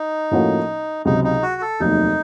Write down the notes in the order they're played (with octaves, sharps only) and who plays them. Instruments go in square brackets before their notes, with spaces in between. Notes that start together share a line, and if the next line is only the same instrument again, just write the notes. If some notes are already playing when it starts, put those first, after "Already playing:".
Already playing: [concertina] D#4
[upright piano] A2 F3 A#3 C#4 F#4
[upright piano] C#2 C3 F#3 [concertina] D#4
[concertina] D#4
F#4
A4
[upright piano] F1 D#2 D#3 F#3 [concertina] D#4